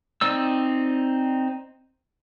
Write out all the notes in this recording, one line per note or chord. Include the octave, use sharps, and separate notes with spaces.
C4 D#4 D5 E6